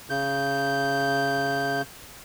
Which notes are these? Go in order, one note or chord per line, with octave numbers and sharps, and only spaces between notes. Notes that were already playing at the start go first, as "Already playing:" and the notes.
C#3 G6